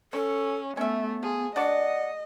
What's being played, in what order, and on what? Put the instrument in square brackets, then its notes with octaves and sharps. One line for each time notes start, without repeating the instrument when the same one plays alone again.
[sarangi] C#4 [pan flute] A4 [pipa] C#5
[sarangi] A3 [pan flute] B3 [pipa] C#4 E5
[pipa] F3 [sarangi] G#4
[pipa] D4 F#4 D5 [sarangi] D#5 [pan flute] F#5